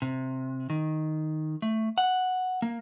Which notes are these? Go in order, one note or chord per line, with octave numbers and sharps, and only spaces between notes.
C3
D#3
A3
F#5
A#3